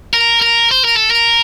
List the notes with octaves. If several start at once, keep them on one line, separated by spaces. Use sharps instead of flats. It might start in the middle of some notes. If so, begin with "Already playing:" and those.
A#4
A#4
C5
A#4
A4
A#4